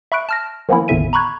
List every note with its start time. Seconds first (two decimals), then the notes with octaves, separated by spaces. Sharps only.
0.12 E5 B5 C#6 F#6 D7
0.29 A5 F6 A#6
0.69 D#3 F3 A#3 B3 C#4 E4
0.88 G#1 E2 A2 D3 E5 D#7
1.13 A#5 B5 C#6 F#6 G#6